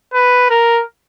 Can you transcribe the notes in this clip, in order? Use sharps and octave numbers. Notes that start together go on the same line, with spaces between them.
B4
A#4